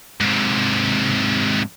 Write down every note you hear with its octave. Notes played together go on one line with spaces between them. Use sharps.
G#2 C3